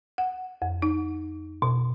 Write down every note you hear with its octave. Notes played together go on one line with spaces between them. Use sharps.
F#5
F2
D#4
B2